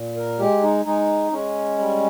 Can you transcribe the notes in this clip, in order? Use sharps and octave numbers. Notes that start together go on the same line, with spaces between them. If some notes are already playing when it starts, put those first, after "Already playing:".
Already playing: A#2
A#4
G#3 G4
D#4
G#3 D#4
G#3 C#4
G3